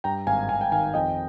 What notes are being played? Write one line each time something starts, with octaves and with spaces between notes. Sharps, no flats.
G2 G5 A#5
G#1 F5 G#5
G#1 F5 G#5
G5
D#3 F5 G#5
F2 D#5 G5